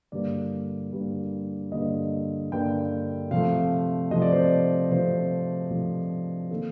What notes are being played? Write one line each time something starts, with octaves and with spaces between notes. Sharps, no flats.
G2 D3 G3 A#3 D5
G2 D3 G3 A#3
G2 D3 G3 A#3 D#5
G2 D3 G3 A#3 G5
C3 F3 A3 F5
C3 F3 A3 D#5
D5
C5
D5
C3 F3 A3 C5
C3 F3 A3
D#3 A#3 A4